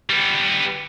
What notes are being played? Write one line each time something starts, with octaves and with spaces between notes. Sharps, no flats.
G3 B3